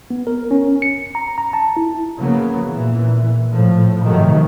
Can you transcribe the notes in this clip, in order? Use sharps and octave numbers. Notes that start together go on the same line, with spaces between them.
B3
A#4
C#4
C#7
A#5
A#5
A5
E4
C#3 F#3 A#3 B3
A#2 E3
A2 F3
G#2 C3 D#3 F3 F#3 A3